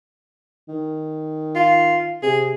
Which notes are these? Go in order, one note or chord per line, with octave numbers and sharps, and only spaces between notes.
D#3
F4
C3 G#4